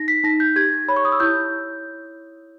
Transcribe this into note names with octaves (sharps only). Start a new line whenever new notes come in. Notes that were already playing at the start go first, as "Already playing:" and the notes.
Already playing: D#4 A#6
B6
D#4 A#6
G6
G4 G#6
C#5 B5
C#6
D#6
E6
E4 G6